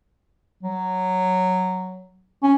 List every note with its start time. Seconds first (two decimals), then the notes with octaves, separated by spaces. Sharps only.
0.63 F#3
2.43 C#4